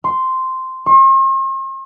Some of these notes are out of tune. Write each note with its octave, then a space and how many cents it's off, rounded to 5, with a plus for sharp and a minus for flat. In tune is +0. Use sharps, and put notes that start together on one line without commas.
C6 -5
C6 +45